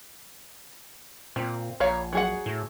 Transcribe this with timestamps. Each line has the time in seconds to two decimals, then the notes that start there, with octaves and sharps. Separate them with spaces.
1.36 A#2 C4
1.80 A#1 C#5 F5 A#5
2.13 F#3 G#4 F#5
2.46 A2